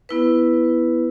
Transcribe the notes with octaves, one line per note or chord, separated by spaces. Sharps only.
B3 E4 B4